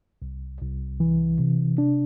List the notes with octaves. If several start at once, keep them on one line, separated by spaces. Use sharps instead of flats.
C2
C2
E3
C3
D4